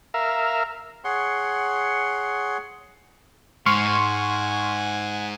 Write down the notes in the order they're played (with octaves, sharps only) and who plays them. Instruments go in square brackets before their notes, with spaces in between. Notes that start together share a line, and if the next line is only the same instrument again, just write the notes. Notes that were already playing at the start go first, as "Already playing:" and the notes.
[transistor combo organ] A#4 E5 F5
[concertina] G#4 C#5 F#5 C6
[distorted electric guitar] G#2 [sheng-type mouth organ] F#5 G#5 [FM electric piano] C6 C#6 F6